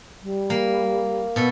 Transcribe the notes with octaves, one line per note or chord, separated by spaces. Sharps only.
G3
A#3
B2 B3 A4